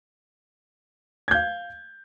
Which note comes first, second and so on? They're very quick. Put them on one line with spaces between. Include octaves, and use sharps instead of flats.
G#6 G6 F5